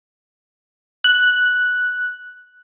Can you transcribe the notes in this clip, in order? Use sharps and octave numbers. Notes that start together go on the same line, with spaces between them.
F#6